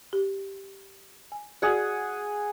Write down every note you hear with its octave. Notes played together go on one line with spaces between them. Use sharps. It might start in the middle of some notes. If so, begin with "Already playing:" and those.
G4
G#5
F#4 G#4 D5 F#5